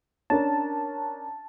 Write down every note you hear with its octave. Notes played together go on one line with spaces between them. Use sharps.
C#4 D4 A#4 A5